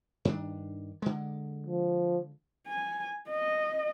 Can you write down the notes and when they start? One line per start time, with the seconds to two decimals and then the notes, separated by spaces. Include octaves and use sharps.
0.25 G2 D#3 D4
1.02 D3 G#3
1.67 F3
2.67 G#5
3.29 D#5